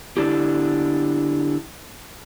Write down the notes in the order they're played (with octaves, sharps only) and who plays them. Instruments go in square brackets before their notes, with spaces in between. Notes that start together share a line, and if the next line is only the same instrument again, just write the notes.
[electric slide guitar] D3 D4 E4 G4